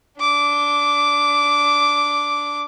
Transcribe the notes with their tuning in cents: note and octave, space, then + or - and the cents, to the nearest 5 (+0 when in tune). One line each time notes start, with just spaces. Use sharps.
D4 -15 D6 -5